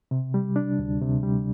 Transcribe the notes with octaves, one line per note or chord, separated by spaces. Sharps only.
C3
G3
D4
D2
C3
G3